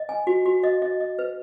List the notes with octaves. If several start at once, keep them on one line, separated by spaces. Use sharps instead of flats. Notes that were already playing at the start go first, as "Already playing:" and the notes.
Already playing: D#5
G#5
F#4
F#4
D#5
D#5
D#5
B4